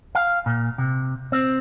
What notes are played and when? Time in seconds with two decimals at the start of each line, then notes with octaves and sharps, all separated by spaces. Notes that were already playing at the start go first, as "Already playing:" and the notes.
0.15 F5
0.46 A#2
0.78 C3
1.32 C4